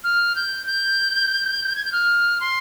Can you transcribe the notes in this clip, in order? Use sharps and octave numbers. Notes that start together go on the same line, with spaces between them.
F6
G6
G6
G#6
G6
F6
C6